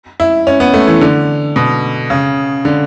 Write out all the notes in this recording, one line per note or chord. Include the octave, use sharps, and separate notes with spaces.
E4
C#4
B3
A3
E3
D3
B2
C#3
D3